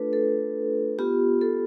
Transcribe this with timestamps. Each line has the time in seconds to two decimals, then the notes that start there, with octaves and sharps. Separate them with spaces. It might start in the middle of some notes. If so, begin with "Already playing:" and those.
Already playing: A3 D4 F4 A4 B4
0.13 A4
0.99 B3 F4 G4
1.41 A4